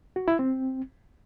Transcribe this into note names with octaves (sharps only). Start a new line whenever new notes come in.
F#4
E4
C4